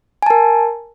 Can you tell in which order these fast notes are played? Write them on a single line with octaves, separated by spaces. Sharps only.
G#5 A5 A#4